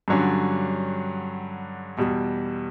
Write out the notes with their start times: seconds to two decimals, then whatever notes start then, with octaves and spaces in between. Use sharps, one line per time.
0.08 G2 D3 F#3 C#4
1.97 E2 B2 G3